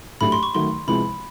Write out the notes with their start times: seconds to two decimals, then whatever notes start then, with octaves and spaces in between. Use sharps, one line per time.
0.21 A2 F#3 A3 D4 G4 B5
0.32 C6
0.43 C#6
0.54 D#3 F#3 A3 C6
0.87 C3 F3 G#3 B3 E4 B5